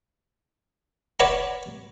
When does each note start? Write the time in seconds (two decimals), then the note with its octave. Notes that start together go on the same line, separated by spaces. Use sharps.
1.20 B4 C#5 D5 F#5 A#5